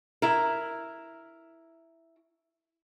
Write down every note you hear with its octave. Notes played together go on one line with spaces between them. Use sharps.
E4 A#4